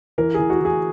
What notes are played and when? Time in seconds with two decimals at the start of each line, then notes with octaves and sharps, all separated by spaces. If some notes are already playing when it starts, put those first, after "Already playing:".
0.18 E3 A#4
0.34 E3 G#4
0.50 F#4
0.61 E3 G#4